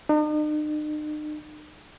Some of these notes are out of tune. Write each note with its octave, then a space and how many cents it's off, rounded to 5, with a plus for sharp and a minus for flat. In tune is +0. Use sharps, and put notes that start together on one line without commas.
D#4 -45